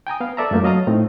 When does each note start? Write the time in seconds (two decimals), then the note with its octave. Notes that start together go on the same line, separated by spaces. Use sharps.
0.07 G5 G#5 A#5 D#6
0.20 B3 F5
0.37 A4 B4 D5 E5 A5 A#5
0.51 F#2 F#3 A3 A#3 F4
0.64 F#3 D#5 F5 A5 A#5 D#6
0.87 A2 A3 C4 D#4 F4